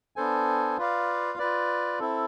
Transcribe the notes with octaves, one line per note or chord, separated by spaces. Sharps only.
B3 D4 A4 C5 G#5
F4 B4 D5 F5
F4 B4 D5
C4 E4 A4